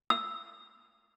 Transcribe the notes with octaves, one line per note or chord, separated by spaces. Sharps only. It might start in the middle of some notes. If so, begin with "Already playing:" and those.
E6